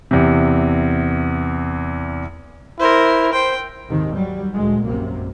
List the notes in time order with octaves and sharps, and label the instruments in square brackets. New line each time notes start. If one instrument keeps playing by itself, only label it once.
[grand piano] E2 C3
[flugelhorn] E4 [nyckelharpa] A#4 C5
[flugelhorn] C5 [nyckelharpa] G5
[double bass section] D#2 G#2 C3 D#3
F#3 G3
D2 A#2 F#3 G#3
A#1 F#2 C3 A#3